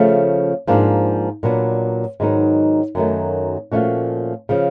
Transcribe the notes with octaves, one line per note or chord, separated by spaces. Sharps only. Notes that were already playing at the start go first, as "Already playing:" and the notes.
Already playing: C#3 F3 A3
G#2 F3 A#3 D4
A#2 F#3 B3 D4
G#2 D#3 F#3 B3 D#4
F#2 D#3 F#3 A3
A#2 F3 A3 C#4 F#4
C#3 F3